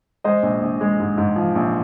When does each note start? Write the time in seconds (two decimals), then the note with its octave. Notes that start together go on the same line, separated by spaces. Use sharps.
0.24 G#3 C5 D#5
0.43 A#1
0.61 A#1
0.81 G#3
1.00 G#2
1.18 G#2
1.36 F3
1.55 A#1